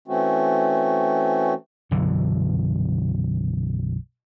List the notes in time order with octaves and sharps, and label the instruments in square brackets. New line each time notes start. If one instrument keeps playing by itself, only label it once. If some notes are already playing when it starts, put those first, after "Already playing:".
[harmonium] E3 A3 C4 C#4 F#4
[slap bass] B1 F#2 D3 E3